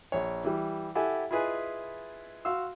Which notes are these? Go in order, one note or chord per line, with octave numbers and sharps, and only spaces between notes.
A#1 C#5
E3 G3
E4 G4 A4 F#5 G#5
E4 F4 G#4 B4 D#5 G#5
F#4 F5 C6 E6